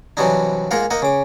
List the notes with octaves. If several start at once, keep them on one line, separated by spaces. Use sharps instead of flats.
C3 E3 F#3 G3 D4 D#4
G#2 A#3 F4 A#4 F5 F#5
A#3 D#4 D#5 F#5
C#3 D6